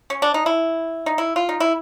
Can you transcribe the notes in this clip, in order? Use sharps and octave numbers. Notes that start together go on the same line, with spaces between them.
C#4
D4
D#4
E4
D#4
E4
F4
D#4
E4